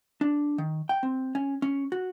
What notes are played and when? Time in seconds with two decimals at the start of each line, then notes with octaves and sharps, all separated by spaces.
0.21 D4
0.58 D#3
0.89 G5
1.03 C4
1.35 C#4
1.62 C#4
1.92 F#4